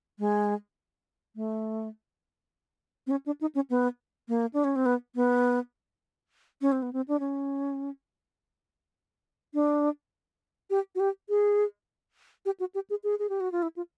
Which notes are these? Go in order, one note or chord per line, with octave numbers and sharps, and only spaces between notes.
G#3
A3
C4
C#4
D4
D#4
C#4
B3
A#3
D4
C#4
C4
B3
B3
C#4
C4
B3
C4
D4
C#4
D4
G4
F#4
G4
G#4
G4
F#4
G4
G#4
G#4
G#4
G4
F#4
F4
E4
F4